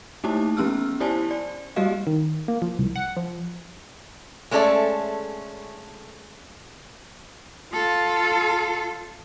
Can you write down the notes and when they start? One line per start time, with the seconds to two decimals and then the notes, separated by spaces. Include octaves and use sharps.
0.24 A3 A#3 D#4 E4 G4 A5
0.57 F3 B3 C#4 G4 E6 F6
1.00 E4 G4 C5 D5 G#5 A5
1.31 D5
1.76 G3 A#3 F#4 G4 D#5 F5
2.07 D#3
2.48 A#3
2.62 F3
2.79 C2
2.96 F#5
3.17 F3
4.51 G#3 A3 C#4 A4 D5 E5
7.73 F4 A4